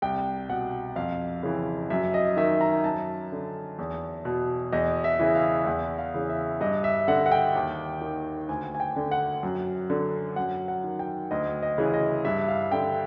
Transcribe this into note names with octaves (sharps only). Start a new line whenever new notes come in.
C2 G5
B2 F#5
F2 F5
C#3 E3
F#2 E5
D#5
D#3 E5
A#5
F#2 A5
D3
E2
B2
E2 D#5
E5
C#3 E3
F5
E2 F#5
F5
C#3 E3
E5
G2 D#5
E5
D3 F#5
F#5
G5
D#2
D#3
D2 G#5
G#5
G5
D3
F#5
F#2
D3
F#2 F#5
F#5
D#3
G5
D2 D#5
D#5
C#3 E3
D#5
G2 E5
F5
D3 G5